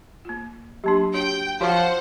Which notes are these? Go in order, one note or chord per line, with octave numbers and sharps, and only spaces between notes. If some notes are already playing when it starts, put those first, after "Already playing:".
A#3 F4
F#3 A#3 D4 G4 A5 C6
D4 F#4 C#5 G5
F3 F#4 A#4 C5 C#5 F#5 C#6